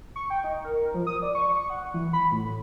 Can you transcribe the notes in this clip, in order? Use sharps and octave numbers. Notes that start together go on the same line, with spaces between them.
C#6
G5
D#4
A#4
F3
D#6
D5
C#6
F#5
E3
B5
A2